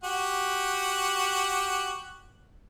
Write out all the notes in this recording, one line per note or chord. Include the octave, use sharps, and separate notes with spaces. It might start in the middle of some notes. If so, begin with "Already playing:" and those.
F#4 G4 F#5